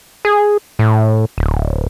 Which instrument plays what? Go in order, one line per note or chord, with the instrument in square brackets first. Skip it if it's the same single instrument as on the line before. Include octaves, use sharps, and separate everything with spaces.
[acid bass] G#4
A2
D1